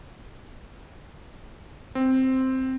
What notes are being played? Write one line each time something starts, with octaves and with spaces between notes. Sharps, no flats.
C4